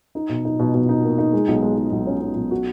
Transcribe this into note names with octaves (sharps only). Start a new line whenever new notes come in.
D#4
B2
D#4
B2
B2
D#4
A#3
D#4
G#3
B1
G#3
G#3
B1
C#4
C#4
B1
F#4